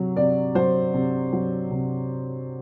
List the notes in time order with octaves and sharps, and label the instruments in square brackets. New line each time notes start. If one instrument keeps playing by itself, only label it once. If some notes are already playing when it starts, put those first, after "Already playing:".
Already playing: [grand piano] C3 F#3
C3 D5
F#3 C5
C3
F#3
C3